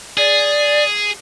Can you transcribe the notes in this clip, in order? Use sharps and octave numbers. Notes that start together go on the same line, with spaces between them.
G#4 D5